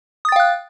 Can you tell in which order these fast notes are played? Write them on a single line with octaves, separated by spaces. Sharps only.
D#6 A6 G5 F5 F#6